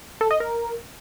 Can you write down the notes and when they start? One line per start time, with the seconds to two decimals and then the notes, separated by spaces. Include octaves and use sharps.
0.21 A4
0.31 D#5
0.40 A#4